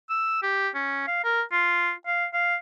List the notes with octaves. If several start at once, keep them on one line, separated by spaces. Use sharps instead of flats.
E6
G4
C#4
F5
A#4
F4
F5
F5